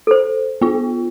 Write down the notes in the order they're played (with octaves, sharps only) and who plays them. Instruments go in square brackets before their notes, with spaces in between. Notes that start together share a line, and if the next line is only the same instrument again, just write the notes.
[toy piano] A4 C5
[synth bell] B3 F4